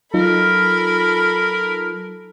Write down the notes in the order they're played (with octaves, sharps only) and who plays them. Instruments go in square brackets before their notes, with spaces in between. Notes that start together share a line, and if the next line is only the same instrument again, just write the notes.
[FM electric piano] F#3 D#4 F4 [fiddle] A4 B5 [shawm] A#4